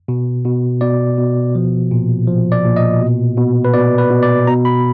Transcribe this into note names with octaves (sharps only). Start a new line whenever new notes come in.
B2
B2
B2 D5
B2
F3
A#2
F3
D5
A#2
D#5
B2
B2
B4
B2 D5
B4
B2
D5
B2 A#5
B5